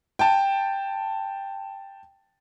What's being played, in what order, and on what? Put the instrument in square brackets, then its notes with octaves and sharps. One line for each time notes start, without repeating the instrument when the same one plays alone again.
[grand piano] G5 A5